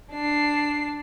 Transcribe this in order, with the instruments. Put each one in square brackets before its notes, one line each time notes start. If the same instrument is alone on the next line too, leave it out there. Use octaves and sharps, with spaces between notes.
[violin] D4 C7